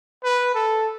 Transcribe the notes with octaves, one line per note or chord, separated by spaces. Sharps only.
B4
A4